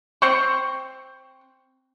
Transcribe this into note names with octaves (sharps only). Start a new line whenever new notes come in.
C4 C5 C#6